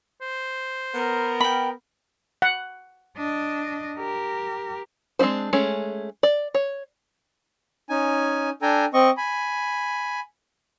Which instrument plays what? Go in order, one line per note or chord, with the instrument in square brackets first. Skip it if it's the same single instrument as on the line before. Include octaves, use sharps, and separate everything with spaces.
[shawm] C5
[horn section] B3 A#4
[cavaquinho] G5 B5
[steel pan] F#5
[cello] D4 D#5
G4 A#4
[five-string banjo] G#3 C4 D4 E4 C5
G#3 A3 C#4
D5
C#5
[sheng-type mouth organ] C#4 D#4 G#5
D4 A4 G5 G#5 A#5
C4 D#5 C#6
G#5 B5